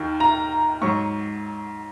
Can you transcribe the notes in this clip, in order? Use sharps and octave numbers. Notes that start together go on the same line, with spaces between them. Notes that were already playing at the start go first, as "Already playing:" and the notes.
Already playing: D#2 D#3
A#5
G#2 F#3 C#6